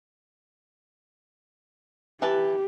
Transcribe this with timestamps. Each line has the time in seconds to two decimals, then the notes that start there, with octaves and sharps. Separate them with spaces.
2.22 E3 G4 B4 A5